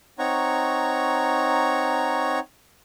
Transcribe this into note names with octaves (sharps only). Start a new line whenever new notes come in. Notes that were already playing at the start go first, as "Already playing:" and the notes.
C4 D#4 C#5 F#5 A#5 C#6